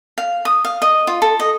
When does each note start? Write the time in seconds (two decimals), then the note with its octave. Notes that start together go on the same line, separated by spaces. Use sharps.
0.18 F5
0.45 D#6
0.65 F5
0.82 D#5
1.07 F4
1.22 A4
1.40 D#5